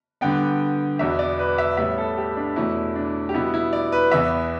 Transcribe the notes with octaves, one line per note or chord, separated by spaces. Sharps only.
G2 D3 B3 G5
E2 B2 B3 E5
D5
B4
E5
A2 G3 B3 E5
A4
G4
D4
E2 B2 A3 E4
D4
G4
B2 G3 B3 E4
E4
D5
B4
E2 E3 B3 E5